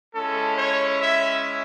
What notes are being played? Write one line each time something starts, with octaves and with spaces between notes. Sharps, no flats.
G#3 C#4 E4 A4
C#5
E5